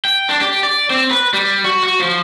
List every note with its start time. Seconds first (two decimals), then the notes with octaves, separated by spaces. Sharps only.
0.05 G5
0.29 D4
0.41 G4
0.63 D5
0.90 C4
1.11 B4
1.34 G3
1.64 F#4
1.84 F#4
2.00 F3